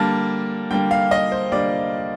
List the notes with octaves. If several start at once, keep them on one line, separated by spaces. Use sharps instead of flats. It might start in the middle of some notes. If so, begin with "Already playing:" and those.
Already playing: D3 G3 A#3 A5
D3 G3 A#3 G5
F5
D#5
C5
D3 G3 A#3 D5